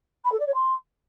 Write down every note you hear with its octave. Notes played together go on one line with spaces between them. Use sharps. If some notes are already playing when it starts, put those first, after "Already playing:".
B5
A4
D5
C#5
C6